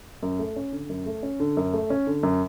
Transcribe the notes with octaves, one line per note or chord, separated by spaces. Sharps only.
F#2
A3
C#4
D3
F#2
A3
C#4
D3
F#2
A3
C#4
D3
F#2